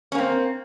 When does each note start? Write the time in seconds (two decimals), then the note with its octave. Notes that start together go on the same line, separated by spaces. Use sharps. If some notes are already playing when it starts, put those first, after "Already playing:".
0.12 C#4
0.15 A#3
0.18 C4